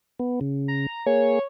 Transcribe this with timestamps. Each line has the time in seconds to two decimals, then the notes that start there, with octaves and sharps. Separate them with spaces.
0.19 B3
0.41 C#3
0.68 A#5
1.06 A#3 G#4 C#5